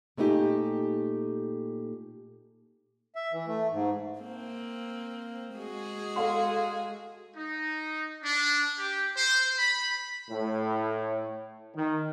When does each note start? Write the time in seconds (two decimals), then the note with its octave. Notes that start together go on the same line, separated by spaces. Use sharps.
0.17 A#2 A3 B3 D#4 G4 G#4
3.16 E5
3.32 E3
3.47 A3
3.71 G#2
4.20 A#3 C4
5.56 G#3 F#4 G#4
6.16 A4 F5 C6
7.36 D#4
8.24 D4
8.79 G4
9.16 C5
9.59 B5
10.30 A2
11.76 D#3